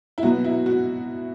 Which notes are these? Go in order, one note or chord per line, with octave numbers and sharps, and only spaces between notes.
E4
B2 F#3 B3 F#4
E4
F#4